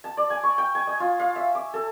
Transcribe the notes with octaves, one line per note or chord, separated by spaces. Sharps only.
A5
D5
G#5
C#6
G5
G#5
D#5
F4
F5
E5
D6
A4